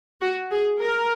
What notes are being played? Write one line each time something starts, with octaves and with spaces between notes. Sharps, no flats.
F#4
G#4
A#4